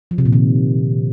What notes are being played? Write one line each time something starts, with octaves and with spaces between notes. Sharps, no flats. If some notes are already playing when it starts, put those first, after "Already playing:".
F3
C3
A#2
D#3